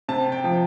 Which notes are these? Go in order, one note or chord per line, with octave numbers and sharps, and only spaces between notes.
C3 A5
G5
F3